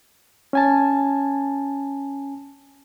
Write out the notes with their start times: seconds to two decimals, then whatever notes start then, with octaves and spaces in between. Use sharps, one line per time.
0.53 C#4 G#5 A5